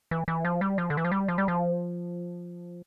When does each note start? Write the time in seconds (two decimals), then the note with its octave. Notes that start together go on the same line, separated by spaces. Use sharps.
0.11 E3
0.28 E3
0.45 F3
0.61 G3
0.78 F3
0.90 D3
0.97 E3
1.05 F3
1.12 G3
1.28 F3
1.38 G3
1.48 F3